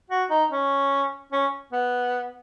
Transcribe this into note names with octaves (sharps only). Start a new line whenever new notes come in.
F#4
D#4
C#4
C#4
B3